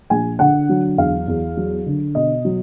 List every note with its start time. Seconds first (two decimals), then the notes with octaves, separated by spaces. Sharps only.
0.10 A#1 G#5
0.39 D3 F#5
0.69 F#3
0.98 E2 F5
1.28 E2
1.57 F#3
1.86 D3
2.15 B2 D#5
2.45 F#3